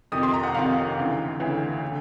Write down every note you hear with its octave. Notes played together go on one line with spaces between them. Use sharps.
F2 C3 D#3 D#6
C6
A#5
F#5
F2 C3 D#3 F5
D2 C#3 E3
D2 C#3 E3
D3